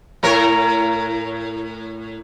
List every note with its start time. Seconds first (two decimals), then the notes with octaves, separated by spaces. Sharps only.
0.23 A2 A#4 C#5